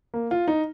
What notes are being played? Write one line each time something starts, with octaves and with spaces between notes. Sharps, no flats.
A#3
F4
D#4